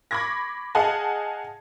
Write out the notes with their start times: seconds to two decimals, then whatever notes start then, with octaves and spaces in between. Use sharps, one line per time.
0.11 B5 C#6 D6 G#6 A#6
0.75 G#4 D#5 F5 F#5 G#5 A5